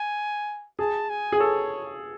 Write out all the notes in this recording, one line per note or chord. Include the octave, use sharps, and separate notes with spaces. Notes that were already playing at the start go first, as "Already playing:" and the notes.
Already playing: G#5
G#4 A5
G#5
G#4
A4 C#5